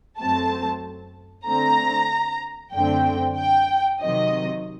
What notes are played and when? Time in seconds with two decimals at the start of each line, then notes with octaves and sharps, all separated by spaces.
0.19 F#2 F#3 A3 C4 A5
1.46 D3 A3 C4 A#5
2.73 F#2 D3 A3 C4 G5
3.37 G5
4.00 C3 D#3 F#3 D#5